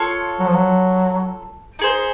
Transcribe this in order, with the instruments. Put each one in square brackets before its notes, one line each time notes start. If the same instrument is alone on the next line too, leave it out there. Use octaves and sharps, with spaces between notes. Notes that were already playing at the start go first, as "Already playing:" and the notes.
Already playing: [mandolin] F4 A4 C#5
[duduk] F#3
F3
F#3
[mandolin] D#4 G#4 C5